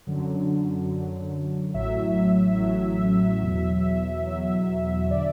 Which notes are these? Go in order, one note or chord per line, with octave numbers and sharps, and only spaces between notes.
F#2 D3 F#3
F#2 D3 F#3
A1 A2 F#3 E5
A1 A2 F#3
E2 B2 F#3
E2 B2 F#3
D3 D5